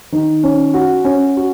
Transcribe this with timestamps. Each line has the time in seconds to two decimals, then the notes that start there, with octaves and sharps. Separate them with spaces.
0.12 D#3
0.44 C#4
0.74 F#4
1.05 C#4
1.37 F#4